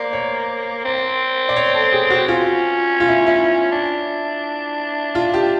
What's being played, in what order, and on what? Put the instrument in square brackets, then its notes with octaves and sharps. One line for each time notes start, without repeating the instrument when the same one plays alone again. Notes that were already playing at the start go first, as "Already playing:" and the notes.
Already playing: [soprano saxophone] A#3 [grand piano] C5 D5
[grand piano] C#5
[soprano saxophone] C4
[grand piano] D5
C#5
A4
G#4
F#4
[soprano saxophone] C#4 [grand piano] F4
[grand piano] F4
E4
E4
[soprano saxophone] D4
[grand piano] F4
G4